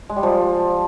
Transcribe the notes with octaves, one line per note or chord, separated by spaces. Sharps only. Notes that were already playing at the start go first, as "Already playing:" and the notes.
G#3
G3
F3